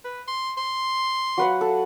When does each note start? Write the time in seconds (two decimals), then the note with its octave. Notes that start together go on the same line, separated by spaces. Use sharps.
0.04 B4
0.28 C6
0.57 C6
1.38 F#3 B4 F#5
1.61 A4